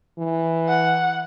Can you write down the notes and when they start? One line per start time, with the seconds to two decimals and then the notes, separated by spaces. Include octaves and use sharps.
0.19 E3
0.69 F#5